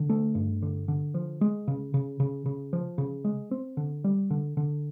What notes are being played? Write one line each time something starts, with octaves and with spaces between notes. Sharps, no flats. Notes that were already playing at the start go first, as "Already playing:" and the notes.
Already playing: D3
A3
G2
D3
D3
F3
G#3
C#3
C#3
C#3
C#3
F3
C#3
G#3
C4
D3
G3
D3
D3